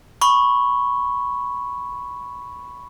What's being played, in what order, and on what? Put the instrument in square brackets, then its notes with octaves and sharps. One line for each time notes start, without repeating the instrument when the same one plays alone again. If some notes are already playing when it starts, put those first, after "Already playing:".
[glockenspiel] B5 C#6